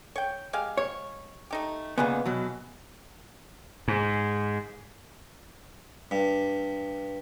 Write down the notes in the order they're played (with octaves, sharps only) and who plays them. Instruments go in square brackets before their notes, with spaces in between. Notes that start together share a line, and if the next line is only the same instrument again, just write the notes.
[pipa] C#5 G5
G#3 G4 F5
[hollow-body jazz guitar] C#5
[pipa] A3 D#4 G4
[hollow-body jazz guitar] A#2 C#3 B3 [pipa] E3 G#3
[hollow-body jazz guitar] B2 F#3
[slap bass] G#2
[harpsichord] G2